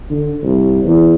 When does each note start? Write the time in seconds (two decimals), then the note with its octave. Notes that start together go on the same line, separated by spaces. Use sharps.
0.10 D3
0.43 C2
0.84 E2